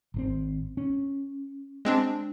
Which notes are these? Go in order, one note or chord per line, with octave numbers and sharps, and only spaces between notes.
G#1 D3 C4
C#4
G#3 C4 D4